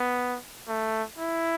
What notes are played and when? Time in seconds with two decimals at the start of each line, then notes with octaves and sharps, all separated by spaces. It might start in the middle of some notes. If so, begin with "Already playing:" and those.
Already playing: B3
0.68 A3
1.19 E4